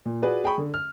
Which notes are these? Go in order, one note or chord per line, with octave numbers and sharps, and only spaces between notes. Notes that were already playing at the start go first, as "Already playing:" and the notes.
A#2
F4 F#4 G#4 B4 D5
G#4 G5 G#5 B5 C#6
D3
F6